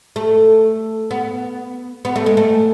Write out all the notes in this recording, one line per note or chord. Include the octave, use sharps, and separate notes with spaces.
A3
B3
B3
A3
G#3
A3